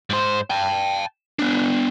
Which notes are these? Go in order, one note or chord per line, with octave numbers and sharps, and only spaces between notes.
G#2 C5
G5 A5
B3 D4